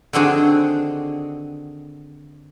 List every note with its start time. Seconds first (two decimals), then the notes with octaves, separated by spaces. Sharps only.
0.13 D3 D#3 C4 D4 F#4 G#4